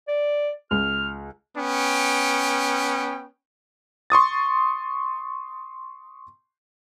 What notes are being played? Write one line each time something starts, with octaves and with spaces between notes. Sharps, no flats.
D5
C#2 F6
B3 C#4 G5
C6 C#6 D#6 A6